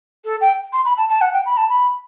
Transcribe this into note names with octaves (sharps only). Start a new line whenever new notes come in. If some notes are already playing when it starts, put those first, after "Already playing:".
A4
G5
C6
B5
A5
A5
F#5
G5
B5
A5
B5